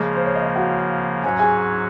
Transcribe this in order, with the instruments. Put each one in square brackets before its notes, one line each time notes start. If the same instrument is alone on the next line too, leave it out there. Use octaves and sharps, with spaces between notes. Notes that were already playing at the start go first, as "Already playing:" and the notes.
Already playing: [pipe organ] C#3 F3 A#3 [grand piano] G#3 G#4
[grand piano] C5
C#5
D#5
F5
F#4 F#5
[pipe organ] G#2 F#3 C#4 F#4 [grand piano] G#5
[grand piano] A#5
G#4 G#5